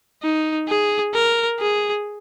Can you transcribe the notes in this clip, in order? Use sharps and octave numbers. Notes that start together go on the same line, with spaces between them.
D#4
G#4
A#4
G#4